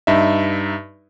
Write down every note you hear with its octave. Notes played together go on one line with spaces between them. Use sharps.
G2 D#4 E5